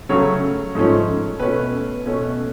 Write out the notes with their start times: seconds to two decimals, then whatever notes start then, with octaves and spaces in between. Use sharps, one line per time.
0.09 C#3 F#3 A3 C#4 C#5
0.75 G#2 F3 A3 C#4
1.40 B2 A3 C#4 B4
2.06 B2 A3 C#4